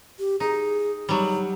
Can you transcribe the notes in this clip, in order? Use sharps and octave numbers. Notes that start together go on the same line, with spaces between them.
G4
D#4 G#4
F#3 G3 D#4